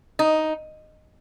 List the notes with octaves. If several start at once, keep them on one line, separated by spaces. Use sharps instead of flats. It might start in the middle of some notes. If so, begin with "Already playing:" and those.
D#4